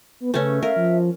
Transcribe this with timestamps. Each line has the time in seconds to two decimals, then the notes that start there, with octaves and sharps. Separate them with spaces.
0.20 B3
0.34 C#3 A3 C#4 B4
0.63 A#4 E5 F5
0.76 F3